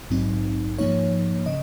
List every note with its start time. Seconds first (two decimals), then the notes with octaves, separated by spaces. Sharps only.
0.10 A#1 G#2 F#3 C4 D#4
0.79 G#2 F3 A#3 D#4 C#5
1.46 C#3 D#5